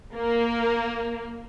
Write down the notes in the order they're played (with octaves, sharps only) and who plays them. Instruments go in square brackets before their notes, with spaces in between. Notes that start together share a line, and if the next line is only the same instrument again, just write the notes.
[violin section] A#3